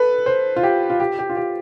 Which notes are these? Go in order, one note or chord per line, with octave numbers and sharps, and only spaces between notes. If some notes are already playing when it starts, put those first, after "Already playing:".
Already playing: A4 B4
C5
F4
G4
F4
G4
G4
F4
G4